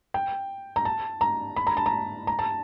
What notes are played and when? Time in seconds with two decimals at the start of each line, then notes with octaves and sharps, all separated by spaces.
0.14 G5
0.76 A#5
0.85 A5
1.21 A#5
1.56 B5
1.67 A#5
1.77 A5
1.86 A#5
2.27 A#5
2.39 A5